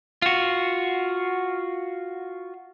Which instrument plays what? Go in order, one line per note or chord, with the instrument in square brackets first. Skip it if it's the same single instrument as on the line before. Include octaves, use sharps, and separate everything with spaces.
[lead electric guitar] F4 F#4